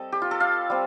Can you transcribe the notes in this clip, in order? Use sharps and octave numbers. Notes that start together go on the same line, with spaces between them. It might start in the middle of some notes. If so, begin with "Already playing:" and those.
Already playing: G3 C4 A4 D#5
G4
F4
A4
F5
G3 C4